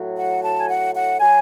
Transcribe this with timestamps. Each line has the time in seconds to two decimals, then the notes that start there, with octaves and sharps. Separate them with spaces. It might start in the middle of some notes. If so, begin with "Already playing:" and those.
Already playing: A2 F#3
0.18 F#5
0.43 A5
0.60 G#5
0.68 F#5
0.94 F#5
1.20 F#3 G#5